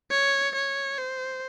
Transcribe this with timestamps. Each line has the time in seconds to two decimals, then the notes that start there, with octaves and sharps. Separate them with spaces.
0.11 C#5
0.55 C#5
0.98 C5